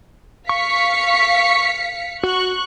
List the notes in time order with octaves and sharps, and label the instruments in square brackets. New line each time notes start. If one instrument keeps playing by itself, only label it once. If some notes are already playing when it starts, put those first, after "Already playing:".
[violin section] F5 B6 C#7 [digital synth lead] C#6
[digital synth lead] F#4 [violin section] C#6 F#6